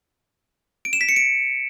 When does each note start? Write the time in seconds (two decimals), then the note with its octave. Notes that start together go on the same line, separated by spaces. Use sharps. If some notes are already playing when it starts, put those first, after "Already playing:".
0.85 D7
0.93 E7
1.01 B6
1.09 C#7
1.16 D7